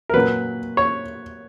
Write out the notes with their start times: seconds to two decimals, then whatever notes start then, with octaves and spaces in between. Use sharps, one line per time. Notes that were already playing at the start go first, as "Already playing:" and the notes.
0.09 A#4
0.14 A#2 F#3 B4
0.77 C#5